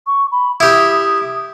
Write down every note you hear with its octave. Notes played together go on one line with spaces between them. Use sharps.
C#6
B5
E4 G4 D#6